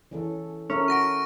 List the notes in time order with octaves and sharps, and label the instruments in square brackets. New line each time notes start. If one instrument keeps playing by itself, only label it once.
[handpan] E3 C#4 A4
[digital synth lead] C#4 [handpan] A4 A#4 E5
[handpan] F#4 [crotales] C#6 A#6 D7